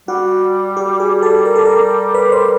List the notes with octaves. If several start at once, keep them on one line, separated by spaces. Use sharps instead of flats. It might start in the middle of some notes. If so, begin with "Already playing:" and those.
G3 F#4
G4
G#4
A4
A#4
A4
A#4
B4
C5